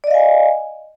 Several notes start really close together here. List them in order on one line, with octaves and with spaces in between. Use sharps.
D5 D#5 F5 G#5